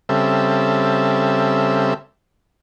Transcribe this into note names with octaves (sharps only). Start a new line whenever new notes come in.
C#3 G3 C4 A4 E5